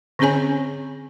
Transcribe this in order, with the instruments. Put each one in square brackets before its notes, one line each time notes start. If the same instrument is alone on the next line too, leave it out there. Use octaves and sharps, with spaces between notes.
[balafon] D3 C4 C#4 G#4 C#5 G#5